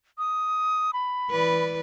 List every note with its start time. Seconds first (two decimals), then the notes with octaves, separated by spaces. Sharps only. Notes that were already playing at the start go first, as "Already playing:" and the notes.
0.18 D#6
0.93 B5
1.30 E3 B4 D5